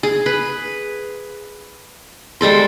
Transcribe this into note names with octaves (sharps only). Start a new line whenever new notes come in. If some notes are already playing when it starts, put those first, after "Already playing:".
G#4
B4
G3 G#3 A4 C5